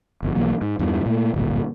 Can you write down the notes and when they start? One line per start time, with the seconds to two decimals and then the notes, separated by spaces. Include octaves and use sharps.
0.23 G1 F2
0.35 B1 E3 F3 A#3
0.61 G#2
0.79 E2 G2 D#3 E3
1.06 A#2 A3
1.34 D1 G1 A#2